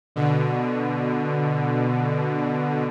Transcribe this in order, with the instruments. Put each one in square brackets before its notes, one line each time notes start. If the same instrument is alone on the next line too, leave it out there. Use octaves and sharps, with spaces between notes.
[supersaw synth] B2 D3